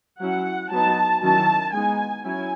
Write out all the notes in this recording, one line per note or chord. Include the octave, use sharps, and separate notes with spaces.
F#3 C#4 E4 F#5
F#3 B3 D#4 A5
D#3 F#3 C#4 E4 A5
G#3 B3 D#4 G#5
F#3 C#4 E4 G#5